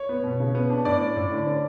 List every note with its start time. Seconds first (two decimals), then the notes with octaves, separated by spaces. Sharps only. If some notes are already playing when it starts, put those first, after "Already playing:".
Already playing: C#5
0.09 B3
0.24 B2
0.40 C#3
0.55 B3
0.70 D4
0.85 A2 D5
1.01 C#4
1.16 A2
1.32 D3
1.47 C#4